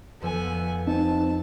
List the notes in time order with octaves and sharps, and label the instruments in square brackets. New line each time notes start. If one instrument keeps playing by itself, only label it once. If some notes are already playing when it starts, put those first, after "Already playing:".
[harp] F2 F3 E6 [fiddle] B3 G#5
[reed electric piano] C4 D#4 [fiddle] A5